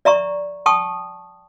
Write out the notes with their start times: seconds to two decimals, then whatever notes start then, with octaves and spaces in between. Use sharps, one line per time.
0.05 D5 E5 A#5 C#6
0.66 G5 A5 C#6 D#6